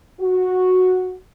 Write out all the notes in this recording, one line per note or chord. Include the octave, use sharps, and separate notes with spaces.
F#4